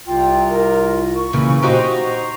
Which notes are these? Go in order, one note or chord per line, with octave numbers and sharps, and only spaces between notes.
C2 C3 F4 G5
A#4
C#6
A#2 C#3 E3
D#4 F#4 G4 C5 A#5